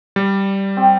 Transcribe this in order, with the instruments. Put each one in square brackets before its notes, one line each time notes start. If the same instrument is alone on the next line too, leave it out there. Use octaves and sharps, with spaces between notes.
[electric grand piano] G3
[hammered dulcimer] C4 G4